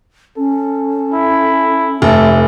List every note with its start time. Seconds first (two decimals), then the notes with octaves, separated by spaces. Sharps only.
0.37 C#4 A4
1.13 E4
2.02 F1 A3 A4 E5